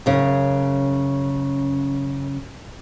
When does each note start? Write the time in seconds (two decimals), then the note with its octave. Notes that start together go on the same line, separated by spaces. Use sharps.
0.06 F#2 C#3